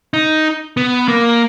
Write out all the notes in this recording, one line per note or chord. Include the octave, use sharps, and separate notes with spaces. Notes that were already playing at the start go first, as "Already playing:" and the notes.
D#4
B3
A#3